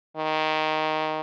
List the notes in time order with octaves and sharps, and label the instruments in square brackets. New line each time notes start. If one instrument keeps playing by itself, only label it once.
[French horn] D#3